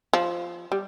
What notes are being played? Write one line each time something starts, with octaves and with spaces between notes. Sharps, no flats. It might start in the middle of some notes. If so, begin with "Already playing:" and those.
F3
G3